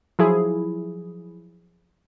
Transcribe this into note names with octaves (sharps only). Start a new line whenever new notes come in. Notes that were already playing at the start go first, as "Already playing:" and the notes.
F3 F#3 E4 G#4